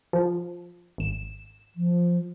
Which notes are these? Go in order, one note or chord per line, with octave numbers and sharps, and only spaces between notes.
F3
G#1 E7
F3